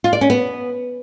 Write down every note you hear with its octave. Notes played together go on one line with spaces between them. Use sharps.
F4
D5
C#4
B3